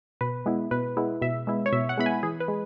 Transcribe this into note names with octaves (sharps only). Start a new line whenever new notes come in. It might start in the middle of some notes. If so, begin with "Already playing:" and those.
B2 B4
G#3 B3 E4
B2 B4
G#3 B3 E4
B2 E5
G#3 B3 E4
C#5
B2 E5
F#5
G#3 B3 E4 B5
G#5
E3 G#4
B4
G#3